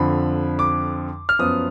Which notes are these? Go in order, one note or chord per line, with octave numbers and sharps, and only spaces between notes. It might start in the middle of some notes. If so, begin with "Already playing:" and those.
Already playing: F2 D3 F3 B5
D6
F6
F#2 F3 B3 D#6